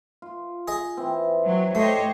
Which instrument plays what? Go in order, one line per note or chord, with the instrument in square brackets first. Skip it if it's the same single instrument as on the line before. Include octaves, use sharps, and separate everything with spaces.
[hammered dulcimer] F4
[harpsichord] G#4 D#5
[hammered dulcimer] E3 C4
[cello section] F#3
[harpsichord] A3 [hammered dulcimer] G4 [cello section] C5 C#5 D#5